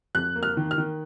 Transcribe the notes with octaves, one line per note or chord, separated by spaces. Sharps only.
F2 F#6
A#3
F6
D#3
F6
D#3